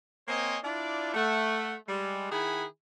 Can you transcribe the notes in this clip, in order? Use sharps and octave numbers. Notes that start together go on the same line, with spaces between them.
A#3 C4 C5 C#5 D#5 G#5
D4 E4 F4 D5
A3 F#5
G3 G#3
D#3 E4 G#4 F#5 G#5 B5